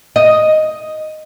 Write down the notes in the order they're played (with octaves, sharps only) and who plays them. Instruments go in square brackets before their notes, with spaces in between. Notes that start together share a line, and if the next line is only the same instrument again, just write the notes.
[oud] D#5